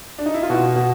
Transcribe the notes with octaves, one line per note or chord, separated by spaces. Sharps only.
D4
D#4
E4
F4
B2 F#4
B2 F#4